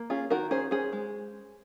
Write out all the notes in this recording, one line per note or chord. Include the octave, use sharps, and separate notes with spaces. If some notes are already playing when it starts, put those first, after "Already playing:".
Already playing: A#3
C#4 F4 G#4
D#3 F#4 A#4
C#4 G#4 C5
C#4 G#4 C5
G#3